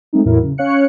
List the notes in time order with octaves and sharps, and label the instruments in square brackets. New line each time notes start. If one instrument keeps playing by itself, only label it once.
[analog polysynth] G#3 A3 C4 D#4
E2 A2 F#3 E4 A#4
C#3
C#4 C#5 F5 F#6 C#7